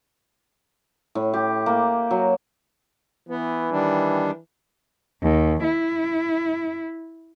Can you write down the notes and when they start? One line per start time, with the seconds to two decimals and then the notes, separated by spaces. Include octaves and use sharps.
1.15 A2
1.33 G4
1.66 A#3
2.11 F#3
3.29 E3 B3
3.71 D#3 G3 D4
5.21 D#2
5.62 E4